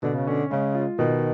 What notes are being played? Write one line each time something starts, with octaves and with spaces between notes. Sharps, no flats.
B2 D3
C#3
D3 C#4
C#3 G#3
F4
B2 D#3